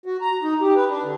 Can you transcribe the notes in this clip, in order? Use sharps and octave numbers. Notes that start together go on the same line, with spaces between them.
F#4
A#5
D#4
G4
B4
D4
D3